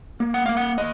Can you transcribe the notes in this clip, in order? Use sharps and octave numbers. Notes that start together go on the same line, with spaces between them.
A#3
F#5
A#3 F5
F#5
D#5